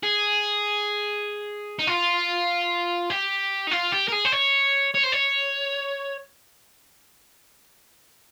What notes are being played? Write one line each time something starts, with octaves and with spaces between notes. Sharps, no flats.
G#4
D#4
F4
G4
D#4
F4
G4
A#4
G#4
C5
C#5
C#5
C5
C#5